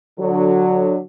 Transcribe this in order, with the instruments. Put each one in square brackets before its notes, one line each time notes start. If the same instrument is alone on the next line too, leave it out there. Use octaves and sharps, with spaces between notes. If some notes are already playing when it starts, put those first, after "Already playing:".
[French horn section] D3 F#3